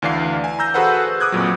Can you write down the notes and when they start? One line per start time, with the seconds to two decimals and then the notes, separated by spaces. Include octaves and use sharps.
0.02 D2 E3 D4 D5 F5 C7
0.44 G#5
0.59 A#5 E6 G6 A#6
0.74 F#4 G#4 A4 B4 C5 F#5
1.20 D6 D#6 F#6 G#6
1.32 F2 A#2 F#3